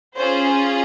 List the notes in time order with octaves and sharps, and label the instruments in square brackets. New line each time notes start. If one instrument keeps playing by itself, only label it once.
[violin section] C#4 F4 G#4 C5